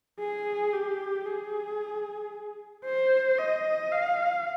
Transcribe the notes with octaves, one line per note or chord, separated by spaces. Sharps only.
G#4
G4
G#4
C5
D#5
F5